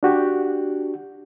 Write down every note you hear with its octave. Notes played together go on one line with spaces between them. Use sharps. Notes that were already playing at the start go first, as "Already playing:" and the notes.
D4 F#4 G4